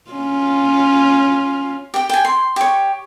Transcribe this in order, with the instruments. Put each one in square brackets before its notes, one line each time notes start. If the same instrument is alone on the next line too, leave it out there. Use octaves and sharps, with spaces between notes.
[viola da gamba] C#4 F4
[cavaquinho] G4 G5
G5 G#5
C6
G4 C#5